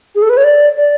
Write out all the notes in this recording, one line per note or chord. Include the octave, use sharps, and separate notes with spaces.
G#4
A4
B4
C#5
D5
D5